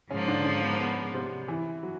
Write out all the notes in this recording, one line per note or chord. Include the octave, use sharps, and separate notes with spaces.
G#2 C#3 F3 A#3 C#4
D3 D4
C#3 C#4
B3
B3
C3 C4
E3 E4
F#3 F#4